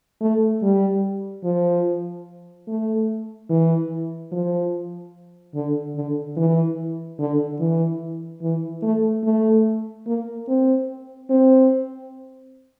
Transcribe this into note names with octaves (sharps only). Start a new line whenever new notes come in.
A3
G3
F3
A3
E3
F3
D3
D3
E3
D3
E3
E3
A3
A3
A#3
C4
C4